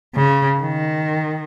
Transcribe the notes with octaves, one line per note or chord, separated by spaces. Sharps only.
C#3
D#3